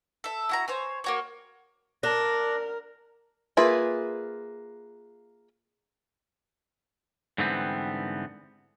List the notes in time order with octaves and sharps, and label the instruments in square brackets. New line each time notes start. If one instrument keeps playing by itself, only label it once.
[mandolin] A4 E5
E4 F#4 A#5
C5 C#5 G#5
A#3 F#4 C#5
[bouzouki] D4 [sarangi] A#4 [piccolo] A#6
[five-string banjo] A#3 F4 G#4 B4 E5
[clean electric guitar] G#2 D3 E3 G3 B3 C4